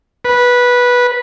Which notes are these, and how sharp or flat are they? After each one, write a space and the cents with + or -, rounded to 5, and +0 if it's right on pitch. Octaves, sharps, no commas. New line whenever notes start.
B4 -15